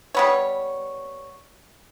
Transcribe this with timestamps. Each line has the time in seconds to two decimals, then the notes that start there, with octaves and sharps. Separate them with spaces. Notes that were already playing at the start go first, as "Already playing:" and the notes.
0.15 G3 B3 C#5